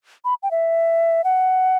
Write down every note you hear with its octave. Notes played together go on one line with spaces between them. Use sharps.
B5
G5
E5
F#5